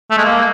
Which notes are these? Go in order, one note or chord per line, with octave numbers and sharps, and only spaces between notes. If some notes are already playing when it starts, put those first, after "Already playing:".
A3
G#3
A#3